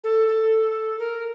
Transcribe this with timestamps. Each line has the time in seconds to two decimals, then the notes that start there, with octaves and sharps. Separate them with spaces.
0.04 A4
0.28 A4
0.99 A#4